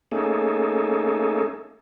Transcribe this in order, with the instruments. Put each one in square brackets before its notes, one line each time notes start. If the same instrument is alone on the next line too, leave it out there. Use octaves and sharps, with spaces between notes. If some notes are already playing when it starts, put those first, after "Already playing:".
[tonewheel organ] A3 A#3 C#4 D#4 G#4 A4